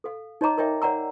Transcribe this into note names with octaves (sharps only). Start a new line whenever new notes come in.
A4 F5
D#4 C#5 D#5 A#5 D6
A#4 C#5 D#5 E5 G5
C#5 D5 F#5 A#5 E6